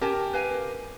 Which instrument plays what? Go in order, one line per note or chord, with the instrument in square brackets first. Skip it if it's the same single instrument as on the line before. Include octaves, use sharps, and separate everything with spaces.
[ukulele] C#4 G#5 A5 [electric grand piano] G4 A#4
[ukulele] B4 F5 G#5